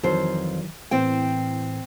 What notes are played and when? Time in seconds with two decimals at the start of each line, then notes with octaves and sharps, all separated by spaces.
0.03 F2 D#3 E3 F#3 C5
0.91 A2 E3 C4 C5 G5